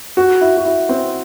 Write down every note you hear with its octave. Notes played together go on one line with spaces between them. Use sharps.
F#4
E4
F#4
E4
C4